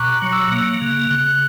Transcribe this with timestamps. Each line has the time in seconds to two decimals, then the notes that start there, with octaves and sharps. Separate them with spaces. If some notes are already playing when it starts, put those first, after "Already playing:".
Already playing: B2 A#5 C#6 D6 F#6
0.12 F#6
0.22 F#3
0.32 E6
0.52 A#3 F#6
0.81 C#3
1.10 C#3 F#6